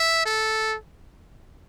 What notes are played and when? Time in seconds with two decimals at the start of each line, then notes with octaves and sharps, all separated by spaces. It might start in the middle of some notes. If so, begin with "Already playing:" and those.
Already playing: E5
0.26 A4